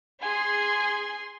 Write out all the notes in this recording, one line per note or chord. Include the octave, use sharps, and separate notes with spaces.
G#4 G#5 C6